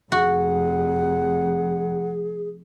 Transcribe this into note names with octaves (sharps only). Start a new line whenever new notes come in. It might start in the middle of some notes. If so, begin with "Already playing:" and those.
F1 F2 F#4 G#4 F#5